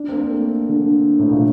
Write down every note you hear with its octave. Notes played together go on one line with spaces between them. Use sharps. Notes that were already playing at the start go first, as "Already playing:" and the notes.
Already playing: D4
C4
A#3
A3
D3
A2
A#2